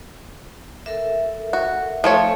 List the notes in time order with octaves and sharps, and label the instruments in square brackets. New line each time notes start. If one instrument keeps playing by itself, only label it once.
[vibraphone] A4 A#4 E5
[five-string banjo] F#4
[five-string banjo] F3 A3 C#5 [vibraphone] A4 G#5